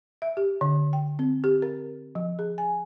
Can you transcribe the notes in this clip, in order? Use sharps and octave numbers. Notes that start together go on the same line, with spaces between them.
E5
G4
D3
G5
C4
G4
A#4
F3
G#4
G#5